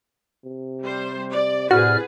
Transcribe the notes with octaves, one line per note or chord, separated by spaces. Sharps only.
C3
G3 C5
D5
A2 C3 F#4 G#4 B4 D5 F6